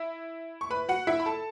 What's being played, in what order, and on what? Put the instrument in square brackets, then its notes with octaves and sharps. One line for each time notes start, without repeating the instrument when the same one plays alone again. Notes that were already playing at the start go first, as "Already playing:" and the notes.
Already playing: [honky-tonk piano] E4 E5
C#6
B4 B5
F#4 F#5
E4 E5
B5
A4 A5